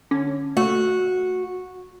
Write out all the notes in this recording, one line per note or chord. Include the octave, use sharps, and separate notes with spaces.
D3 C#4
A3 F#4